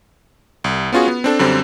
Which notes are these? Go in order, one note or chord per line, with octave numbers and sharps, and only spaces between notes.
C2
B3 C#4 F4 F#4 G#4
B3
C4 D4 A4
F#2 D3 G3 C4